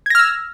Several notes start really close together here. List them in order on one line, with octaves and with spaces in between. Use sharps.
G#6 A#6 F6 E6